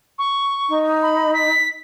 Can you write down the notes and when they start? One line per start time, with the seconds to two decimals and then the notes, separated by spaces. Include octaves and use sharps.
0.19 C#6
0.69 D#4
1.03 B5
1.34 B6